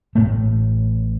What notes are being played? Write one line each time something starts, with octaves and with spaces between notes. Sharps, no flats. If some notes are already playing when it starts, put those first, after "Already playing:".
A1 A2 A3